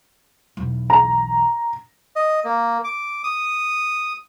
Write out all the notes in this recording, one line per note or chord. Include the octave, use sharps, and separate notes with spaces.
B1 E2
A#5
D#5
A#3
D6
D#6